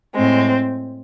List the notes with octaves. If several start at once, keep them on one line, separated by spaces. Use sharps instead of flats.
A2 G#3 C4